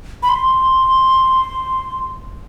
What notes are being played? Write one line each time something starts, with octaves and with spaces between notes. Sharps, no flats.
B5
C6